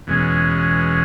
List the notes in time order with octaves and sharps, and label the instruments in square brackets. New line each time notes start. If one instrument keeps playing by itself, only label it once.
[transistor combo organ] E2 B2 G#3 C#4